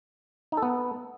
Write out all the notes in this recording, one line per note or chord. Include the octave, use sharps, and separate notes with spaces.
D#4
A4
B3